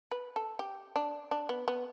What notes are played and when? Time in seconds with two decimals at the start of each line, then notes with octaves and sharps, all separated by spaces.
0.11 B4
0.36 A4
0.59 G4
0.96 D4
1.31 D4
1.49 B3
1.68 B3